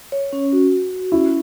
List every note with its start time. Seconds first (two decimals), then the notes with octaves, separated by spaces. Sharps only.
0.12 C#5
0.33 C#4
0.53 F#4
0.72 F#4
0.92 F#4
1.12 C#4 E4